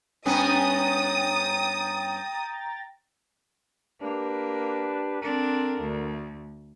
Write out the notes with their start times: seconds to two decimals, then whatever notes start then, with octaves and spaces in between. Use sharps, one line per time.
0.26 G2 B3 C#4 G5 A#5 D#6 A6
4.01 A#3 D4 G4 B4
5.22 D3 C4 D4 A#4
5.80 D2